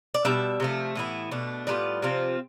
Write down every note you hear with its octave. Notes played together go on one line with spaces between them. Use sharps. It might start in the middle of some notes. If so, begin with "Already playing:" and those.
D5
B2 G3 D4 E5
C3 F3 A3
A2 E3 B3 E4
B2 A3 D4
A2 G3 B3 F4 D5
C3 F3 C4 F4